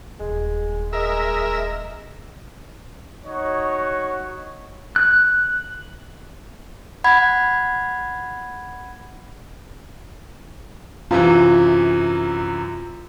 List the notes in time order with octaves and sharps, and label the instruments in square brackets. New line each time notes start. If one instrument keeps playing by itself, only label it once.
[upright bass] D#1 [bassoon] G#3
[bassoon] G#3 [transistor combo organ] A#4 E5 [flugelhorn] D#5
[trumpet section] D#4 F#4 C#5
[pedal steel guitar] F#6
[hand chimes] F#5 B5 G#6
[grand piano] F#2 C3 E3 [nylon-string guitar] F4